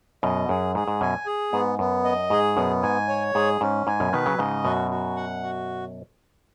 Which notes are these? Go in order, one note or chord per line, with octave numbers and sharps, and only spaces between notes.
F#2 B2 D#5
F#2 G#4
G#2 G#4
G#2
F#2 B2 G#5
G#4
G#2 B3
F#2 B3
D#5
G#2 G#4
F#2 B2 B3
G#2 G#5
C#5
G#2 G#4
G#2 C#4
G#2 G#5
F#2 B2
B2 D#3 B4
C#3 F#3
G#2 C#3 D#5
F#2 B2 F#4
F#4
F#5
F#4